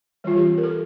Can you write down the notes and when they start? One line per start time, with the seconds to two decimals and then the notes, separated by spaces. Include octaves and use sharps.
0.24 E3 G3 C4 F4
0.37 G4
0.58 A#4
0.63 A4